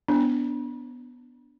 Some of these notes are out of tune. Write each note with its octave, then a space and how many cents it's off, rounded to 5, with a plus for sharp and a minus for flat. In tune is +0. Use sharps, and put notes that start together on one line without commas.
B3 +0 D4 -15